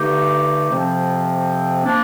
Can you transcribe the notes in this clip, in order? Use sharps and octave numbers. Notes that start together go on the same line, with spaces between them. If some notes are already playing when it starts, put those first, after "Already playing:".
Already playing: G2 D3 A3 D#4 G4
F2 C3 F3 C4
F3 A#3 D4